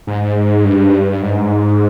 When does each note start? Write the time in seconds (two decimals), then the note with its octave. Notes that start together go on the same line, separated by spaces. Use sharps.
0.07 G#2
0.64 G2
1.22 G#2